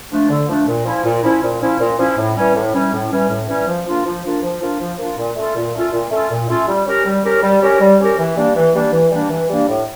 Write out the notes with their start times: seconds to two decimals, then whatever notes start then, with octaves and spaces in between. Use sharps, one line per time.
0.11 F3 A3 D4
0.29 D3
0.48 F3 A3 D4
0.67 A#2
0.85 F3 C#4 E4
1.04 A#2
1.23 F3 C#4 E4
1.42 A#2
1.61 F3 C#4 E4
1.79 A#2
1.98 F3 C#4 E4
2.17 A2
2.36 E3 G3 C#4
2.55 A2
2.74 E3 G3 C#4
2.93 A2
3.10 E3 G3 C#4
3.29 A2
3.48 E3 G3 C#4
3.67 F3
3.87 A#3 D4 F4
4.05 F3
4.23 A#3 D4 F4
4.42 F3
4.61 A#3 D4 F4
4.80 F3
4.99 A#3 D4 F4
5.17 A#2
5.36 A3 C#4 F4 A4
5.56 A#2
5.74 A3 C#4 F4 A4
5.92 A#2
6.11 A3 C#4 F4 A4
6.31 A#2
6.49 A3 C#4 F4 A4
6.67 G3
6.87 C#4 G4 A#4
7.05 G3
7.24 C#4 G4 A#4
7.42 G3
7.62 C#4 G4 A#4
7.80 G3
7.99 C#4 G4 A#4
8.18 E3
8.36 G3 A#3 D4
8.55 E3
8.74 G3 A#3 D4
8.93 E3
9.11 G3 A#3 D4
9.30 E3
9.49 G3 A#3 D4
9.68 A2